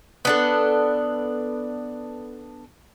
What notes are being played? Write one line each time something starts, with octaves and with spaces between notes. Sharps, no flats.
B3 D4 A4